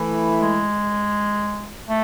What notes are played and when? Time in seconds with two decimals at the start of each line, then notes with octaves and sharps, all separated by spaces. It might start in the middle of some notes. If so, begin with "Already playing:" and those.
Already playing: E3 A3 E4
0.41 G#3
1.87 A3